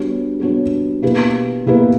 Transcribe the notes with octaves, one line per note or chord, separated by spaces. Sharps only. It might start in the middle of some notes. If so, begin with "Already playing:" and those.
Already playing: G3 B3 D4 F#4 C#5
G3 B3 D4 F#4 C#5
B2 A#3 E4 G4 B4
B2 A#3 E4 G4 B4